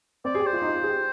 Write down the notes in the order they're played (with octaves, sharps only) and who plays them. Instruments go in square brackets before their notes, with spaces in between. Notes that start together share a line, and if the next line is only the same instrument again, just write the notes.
[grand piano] C4 [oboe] D5
[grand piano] G#4
G4
[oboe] C5
[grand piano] F4
D#4
F4
G#4
G4